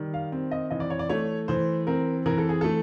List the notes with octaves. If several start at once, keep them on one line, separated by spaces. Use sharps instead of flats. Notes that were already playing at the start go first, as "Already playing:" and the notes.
Already playing: D#3 G3
F5
C4
D#5
E3 D#5
D5
C#5
D5
A3 C#5
E3 C5
C4 A#4
E3 A#4
A4
G#4
A3 A4